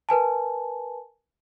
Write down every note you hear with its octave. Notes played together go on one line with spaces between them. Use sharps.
A#4 B4 G#5 A5